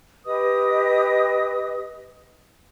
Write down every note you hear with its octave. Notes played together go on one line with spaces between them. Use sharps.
G4 B4 D#5 D#6